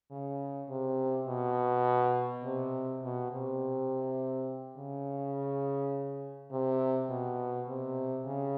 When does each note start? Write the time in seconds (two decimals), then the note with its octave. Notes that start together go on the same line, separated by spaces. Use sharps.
0.11 C#3
0.69 C3
1.27 B2
2.44 C3
3.03 B2
3.32 C3
4.77 C#3
6.52 C3
7.10 B2
7.68 C3
8.26 C#3